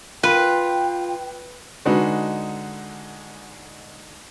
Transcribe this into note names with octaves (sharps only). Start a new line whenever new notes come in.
F4 B4 G5
D3 G#3 D#4 F#4 B4